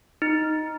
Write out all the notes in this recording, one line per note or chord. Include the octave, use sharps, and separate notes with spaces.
D#4